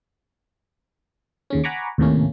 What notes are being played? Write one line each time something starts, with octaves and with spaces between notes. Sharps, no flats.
D#2 C#3 C#4
F#5 G#5 A#5 B5 C#6 D6
D#2 A2 C3 A3 A#3 C#4